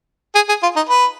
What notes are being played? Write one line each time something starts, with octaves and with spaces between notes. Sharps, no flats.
G#4
G#4
F4
D#4
B4